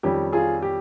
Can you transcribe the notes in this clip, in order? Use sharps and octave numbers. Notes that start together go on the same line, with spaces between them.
F2 D#3 G3 C#4 G4
F4 G#4
G4